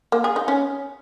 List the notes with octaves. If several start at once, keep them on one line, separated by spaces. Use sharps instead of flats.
A#3
G#4
D#4
C#4